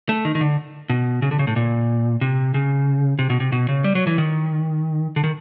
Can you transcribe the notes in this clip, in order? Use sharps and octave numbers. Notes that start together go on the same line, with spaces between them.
A3
D#3
D#3
D3
B2
C#3
D3
C#3
A2
A#2
C3
C#3
C3
B2
C3
B2
C#3
G3
F#3
E3
D#3
D3
D#3